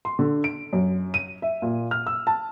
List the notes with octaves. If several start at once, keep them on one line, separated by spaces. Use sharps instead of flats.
C6
D3
D7
F#2
D#7
E5
A#2
F6
E6
A5